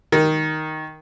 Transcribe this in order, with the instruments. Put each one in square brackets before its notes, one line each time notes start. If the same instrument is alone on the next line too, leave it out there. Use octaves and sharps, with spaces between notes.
[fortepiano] D#3